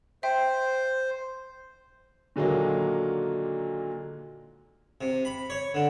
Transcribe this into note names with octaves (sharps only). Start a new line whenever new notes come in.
C5 E5 G5
A#2 D3 D#3 F#3 G#3 A#3
C3
B5
C#5
D3